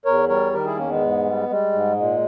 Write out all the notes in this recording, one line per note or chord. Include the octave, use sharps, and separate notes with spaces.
E2 A#4 C#5
G3 A#4 C#5
D#3 G4 A#4
E4 G#4
E2 A#3 C#4
G#3 B3
G#2
G3
G3 G#3
G#2
A#2 G#3